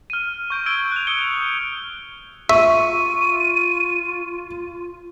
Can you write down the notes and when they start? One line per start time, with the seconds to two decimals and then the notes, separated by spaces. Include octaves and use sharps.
0.10 F6 D#7
0.50 C#6 G6 D7
0.66 E6 G#6 D7 G7
0.92 F#6 F7
1.07 D#6 E6 G6 C#7 G7
2.49 F4 E5 C#6 D#7